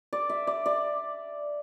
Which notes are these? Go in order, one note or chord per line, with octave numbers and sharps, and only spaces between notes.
D5
E5
D5
D5